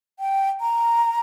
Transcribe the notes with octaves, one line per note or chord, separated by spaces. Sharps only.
G5
A#5